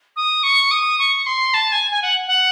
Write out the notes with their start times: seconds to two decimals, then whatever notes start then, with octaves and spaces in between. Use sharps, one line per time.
0.16 D#6
0.43 C#6
0.71 D#6
0.99 C#6
1.26 C6
1.54 A5
1.72 G#5
1.91 G#5
2.02 F#5
2.27 F#5